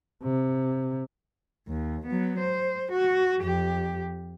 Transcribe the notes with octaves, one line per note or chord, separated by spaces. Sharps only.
C3
D#2
F#3 B3
C5
F#4
F2 G4